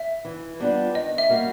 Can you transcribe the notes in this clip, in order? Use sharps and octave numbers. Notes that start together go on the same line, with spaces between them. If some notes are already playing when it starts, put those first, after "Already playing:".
Already playing: E5
E3
G3 B3 D4 F4
D#3 D#5
E5
G3 A#3 C#4 F#4